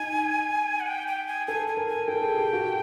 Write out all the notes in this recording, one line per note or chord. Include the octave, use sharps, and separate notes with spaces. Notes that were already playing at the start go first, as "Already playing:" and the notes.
Already playing: D#4 G#5
F#5
G5
G5
G#5
A4 G#5
G#5
A#4
G#5
A4 G5
G#4
G4
F#4